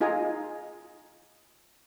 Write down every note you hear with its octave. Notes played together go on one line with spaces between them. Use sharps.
D#4 F4 G#4 D#5 G#5 A#5